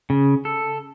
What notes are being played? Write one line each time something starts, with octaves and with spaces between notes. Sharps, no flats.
C#3
A4